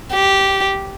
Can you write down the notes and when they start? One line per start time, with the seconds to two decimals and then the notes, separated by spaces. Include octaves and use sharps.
0.13 G4